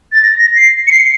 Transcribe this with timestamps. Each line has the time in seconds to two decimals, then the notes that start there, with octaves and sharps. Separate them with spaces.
0.12 A6
0.23 A#6
0.39 A#6
0.56 C7
0.87 C#7
0.91 C7